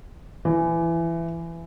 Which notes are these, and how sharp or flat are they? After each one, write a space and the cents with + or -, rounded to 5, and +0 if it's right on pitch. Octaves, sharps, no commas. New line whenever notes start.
E3 +20